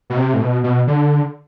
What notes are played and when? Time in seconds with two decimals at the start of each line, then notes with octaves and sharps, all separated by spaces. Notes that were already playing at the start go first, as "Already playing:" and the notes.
0.10 B2
0.17 C3
0.34 A2
0.41 B2
0.64 B2
0.87 D3